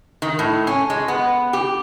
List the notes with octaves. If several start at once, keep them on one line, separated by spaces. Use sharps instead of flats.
D#3
A2
C#4
G#3
B3
G4